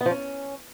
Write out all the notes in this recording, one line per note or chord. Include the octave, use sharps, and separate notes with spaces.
B3
F3
C#4